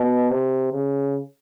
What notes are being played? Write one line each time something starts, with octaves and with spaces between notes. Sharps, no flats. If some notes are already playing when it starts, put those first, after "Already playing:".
Already playing: B2
C3
C#3